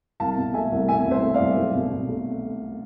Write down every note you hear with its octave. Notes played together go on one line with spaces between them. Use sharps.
C2 F5 A5
B2
A3 E5 G#5
C2
B2 E5 G#5
C2
C5 E5
A3
D5 F5
C2
B1
B2
B2
A3